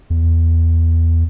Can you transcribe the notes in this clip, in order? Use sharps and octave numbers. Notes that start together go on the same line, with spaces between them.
E2